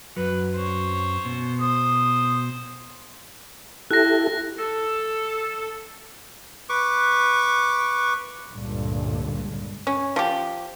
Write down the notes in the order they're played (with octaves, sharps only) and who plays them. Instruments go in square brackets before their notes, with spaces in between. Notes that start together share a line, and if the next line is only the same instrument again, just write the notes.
[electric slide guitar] F#2 F#3 [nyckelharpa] B4
[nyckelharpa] C5 C#5
[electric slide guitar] B2
[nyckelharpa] C5 [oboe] D#6
[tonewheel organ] E4 G4 A4 [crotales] F#6 A#6
[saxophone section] A4
[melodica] B4 C#6 D6
[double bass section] C#2 G2 A#2 D3
[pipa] C#4
F3 G4